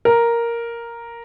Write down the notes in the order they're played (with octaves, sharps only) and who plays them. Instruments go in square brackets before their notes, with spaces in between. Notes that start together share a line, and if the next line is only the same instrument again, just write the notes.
[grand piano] A#4